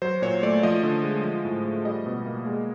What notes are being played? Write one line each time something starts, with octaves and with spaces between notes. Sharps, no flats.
F#3 C5
A#2 C#5
A3 D5
F3 D#5
D3
G#3
F3
A2
A3
G3 D#5
B2
A#3
G#3